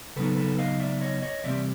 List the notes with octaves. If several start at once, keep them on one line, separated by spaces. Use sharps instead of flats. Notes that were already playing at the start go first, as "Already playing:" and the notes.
C#3 F#3 B3 D#4 A4 B4
A4 B4
D#5 F5
D5 E5
C#5 D#5
C#5 D#5
C3 E3 G3 C4 D5 E5